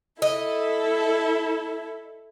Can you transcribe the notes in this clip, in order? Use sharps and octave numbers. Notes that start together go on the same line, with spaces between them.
E4 A4 D#5